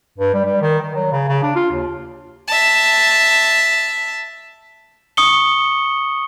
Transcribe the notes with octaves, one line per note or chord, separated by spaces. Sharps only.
G2
G3
G3
D#3
D#3
F#3
C#3
C#3
D4
F4
D#2
E5 A5
C#6 D#6 C#7 G7